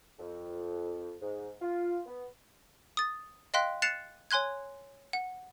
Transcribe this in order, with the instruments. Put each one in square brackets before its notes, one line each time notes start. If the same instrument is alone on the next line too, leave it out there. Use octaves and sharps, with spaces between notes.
[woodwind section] F2
G#2
F4
B3
[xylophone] D#6 A6
D#5 F5 G5 C6 F#6 B6
F#6 A6 C7 C#7 E7 F7
C#5 G#5 C6 F#6 G#6
F#5